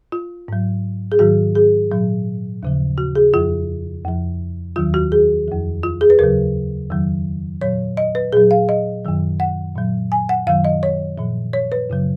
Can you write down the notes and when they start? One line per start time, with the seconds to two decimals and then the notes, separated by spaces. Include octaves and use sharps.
0.12 F4
0.48 G#2 F#3
1.12 G#4
1.19 G#2 D#3 F#3 F#4
1.55 G#4
1.91 A#2 F#3
2.63 D#2 C#3 F3
2.98 F#4
3.15 G#4
3.34 F2 F3 F4
4.05 F2 F3
4.76 D#2 D#3 F#3 F4
4.94 F#4
5.12 G#4
5.48 F2 F3
5.83 F4
6.01 G#4
6.10 B4
6.19 D#2 C#3 F#3 A#4
6.90 F2 D#3 F#3
7.61 A#2 F#3 C#5
7.97 D#5
8.15 B4
8.33 A#2 F#3 G#4
8.51 F5
8.69 D#5
9.04 F#2 D#3 F#3
9.40 F#5
9.75 A#2 F#3
10.12 G#5
10.29 F#5
10.46 F#2 D#3 F#3 F5
10.65 D#5
10.83 C#5
11.18 A#2 F3
11.53 C#5
11.72 B4
11.90 F#2 C#3 F#3